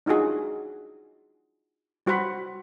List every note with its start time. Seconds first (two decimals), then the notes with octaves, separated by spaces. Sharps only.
0.06 D4 D#4 F4 F#4 G#4
2.06 G3 F#4 C5 F#5 B5